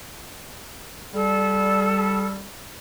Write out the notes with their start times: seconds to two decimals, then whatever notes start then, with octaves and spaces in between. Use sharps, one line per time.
1.14 G3 A4